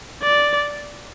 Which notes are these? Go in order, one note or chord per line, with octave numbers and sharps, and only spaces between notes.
D5